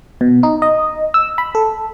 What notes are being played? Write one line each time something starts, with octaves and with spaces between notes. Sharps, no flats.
B2
D#4
D#5
E6
B5
A4